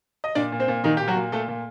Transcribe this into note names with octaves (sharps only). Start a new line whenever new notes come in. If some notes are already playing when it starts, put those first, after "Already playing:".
D#5
A#2 D4 D5
A#2
C4 C5
A#2
A#2 D#3 D#4
A#2 G4
F#3 F#4
A#2
A#2 A3 A4
A#2